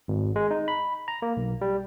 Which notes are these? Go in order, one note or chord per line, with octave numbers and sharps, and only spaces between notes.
G#1
G#3
D#4
B5
A#5
A#3
B1
G3